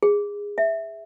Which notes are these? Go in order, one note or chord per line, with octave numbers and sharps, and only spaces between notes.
G#4
E5